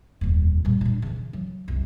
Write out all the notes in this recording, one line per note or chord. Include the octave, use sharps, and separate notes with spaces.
D#1 F2
A#2 G3
A#2 D4
C#3 E3
F#3
F1 C2